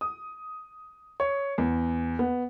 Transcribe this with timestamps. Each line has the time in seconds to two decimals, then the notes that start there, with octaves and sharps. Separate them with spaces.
0.01 D#6
1.20 C#5
1.58 E2
2.19 B3